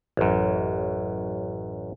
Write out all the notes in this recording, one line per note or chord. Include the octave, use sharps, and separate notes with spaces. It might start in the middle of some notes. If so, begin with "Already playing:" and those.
A1 F#2